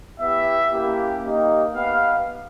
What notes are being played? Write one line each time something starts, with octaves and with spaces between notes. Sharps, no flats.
B3 E4 G4 E5
A#3 C#4 E4 G4
A#3 D#4 G4
B3 D#4 G4 F5